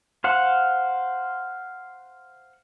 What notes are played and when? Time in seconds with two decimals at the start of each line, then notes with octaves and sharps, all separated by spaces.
0.24 C5 F5 F#5